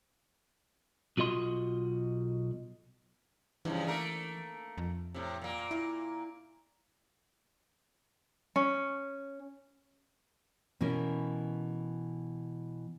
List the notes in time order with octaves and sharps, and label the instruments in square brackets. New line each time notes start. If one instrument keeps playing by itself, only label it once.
[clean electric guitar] B1 F4 F#4 D#5 C6
[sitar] G2 C#3 F3 [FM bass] E3
[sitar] A3 A#3 A#4
[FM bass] F2
[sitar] A2 C3
A#2 A#3
[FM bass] E4
[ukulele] C#4
[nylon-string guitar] B2 E3 C#4 A#4